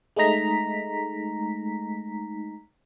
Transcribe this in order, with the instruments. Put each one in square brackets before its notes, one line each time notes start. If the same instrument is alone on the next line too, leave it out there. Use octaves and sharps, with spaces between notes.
[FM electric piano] G#3 A3 D#4 A#5 B6